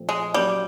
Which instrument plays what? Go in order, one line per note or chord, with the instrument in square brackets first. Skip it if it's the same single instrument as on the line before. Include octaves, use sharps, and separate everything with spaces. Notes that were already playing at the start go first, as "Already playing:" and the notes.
Already playing: [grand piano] A#2 F3 A3 C4
[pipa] G#3
[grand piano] F#3 A#3 C#4 [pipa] G3